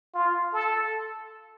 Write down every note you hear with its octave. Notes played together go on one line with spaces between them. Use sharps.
F4
A4